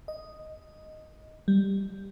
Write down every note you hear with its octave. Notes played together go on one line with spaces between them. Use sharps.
D#5
G3